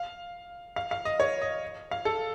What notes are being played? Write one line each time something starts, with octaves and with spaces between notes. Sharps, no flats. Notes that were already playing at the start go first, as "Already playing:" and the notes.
Already playing: F5
F5
F5
D#5
C#5
D#5
F5
A4